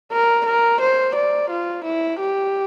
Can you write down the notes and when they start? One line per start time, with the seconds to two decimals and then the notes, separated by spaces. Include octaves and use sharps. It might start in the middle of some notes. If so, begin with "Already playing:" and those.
0.12 A#4
0.47 A#4
0.81 C5
1.16 D5
1.51 F4
1.85 E4
2.20 G4